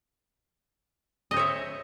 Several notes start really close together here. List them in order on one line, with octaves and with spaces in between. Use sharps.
D#5 C5 C#5 E5